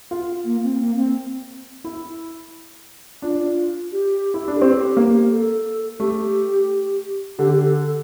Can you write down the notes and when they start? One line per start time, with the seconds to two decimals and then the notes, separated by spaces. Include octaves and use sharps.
0.11 F4
0.45 A#3
0.63 C4
0.80 A#3
0.97 C4
1.84 E4
3.22 D4 F4
3.92 G4
4.34 E4
4.48 D4
4.56 A4
4.61 C4 G4
4.97 A#3
5.31 A4
5.99 A3 G4
7.38 D3 G4
7.56 A4
7.73 A4